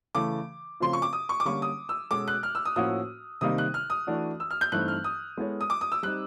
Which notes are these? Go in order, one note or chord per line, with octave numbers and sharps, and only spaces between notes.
C#3 E3 A3 D6
C#3 F3 A3 C4 F4 C6
C#6
D6
D#6
C#6
D6
D3 G3 A#3 C#4 C#6
D#6
E6
B2 G#3 C#4 F#4 A4 D6
F#6
F6
E6
D#6
A2 F3 A#3 C#4 F#4 D#6
C3 D#3 G3 A#3 D#4 D#6
F#6
F6
D#6
E3 A3 D4 F#4
E6
F6
G6
G2 E3 A3 C4 D#4 F#6
F6
D#6
G#3 B3 E4 A4 C#5
D#6
D6
D#6
E6
G3 C4 D#4 F#6